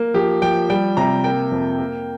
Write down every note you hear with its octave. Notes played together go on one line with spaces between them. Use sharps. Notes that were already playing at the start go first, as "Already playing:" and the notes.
Already playing: A#3
F3 G4
F3 G5
G3 G5
C3 A#5
A#3 G5
F2
A#3